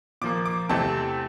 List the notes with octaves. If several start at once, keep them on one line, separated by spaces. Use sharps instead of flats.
A#2 F3 A#3 D6
D6
E2 C3 E3 A3 C4 A5